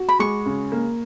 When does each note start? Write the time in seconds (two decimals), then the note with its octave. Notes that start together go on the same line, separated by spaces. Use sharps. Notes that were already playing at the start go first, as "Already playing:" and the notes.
Already playing: F#4
0.09 B5
0.19 G#3 C#6
0.46 C#3
0.72 A#3